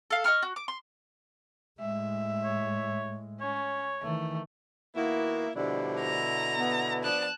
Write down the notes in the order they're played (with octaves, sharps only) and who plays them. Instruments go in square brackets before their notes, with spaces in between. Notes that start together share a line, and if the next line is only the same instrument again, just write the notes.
[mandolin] A4 F5
D#5 G5 C#6 F6
F#4
D6
C6
[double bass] A2 G#3 [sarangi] E5
[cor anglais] C#5
[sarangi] C#4 [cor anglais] C#5
[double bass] D#3 E3 [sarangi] A3
[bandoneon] D#3 B3 F#4 [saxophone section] A#3 E4
[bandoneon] B2 D3 E4 [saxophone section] F3 G3 D4
[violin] A#5
[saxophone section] B3
[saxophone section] F3 B3 D4 [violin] A5 F#6